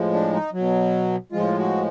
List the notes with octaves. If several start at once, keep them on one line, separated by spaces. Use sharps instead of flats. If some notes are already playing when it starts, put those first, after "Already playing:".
Already playing: A2 F3 G#3
D4
D#4
B2 F#3
A2 F3 G#3 F4
F#4